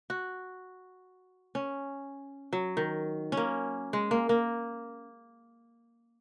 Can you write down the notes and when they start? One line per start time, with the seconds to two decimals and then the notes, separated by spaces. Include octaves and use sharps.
0.10 F#4
1.55 C#4
2.53 F#3
2.77 D#3
3.32 C#4
3.37 A#3
3.93 G#3
4.11 A#3
4.29 A#3